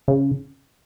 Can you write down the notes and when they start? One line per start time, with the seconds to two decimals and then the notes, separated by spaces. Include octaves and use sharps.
0.08 C#3